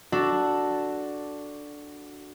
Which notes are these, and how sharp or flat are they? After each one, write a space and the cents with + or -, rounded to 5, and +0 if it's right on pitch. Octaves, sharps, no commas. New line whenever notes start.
D4 +0 F#4 +0 A4 +0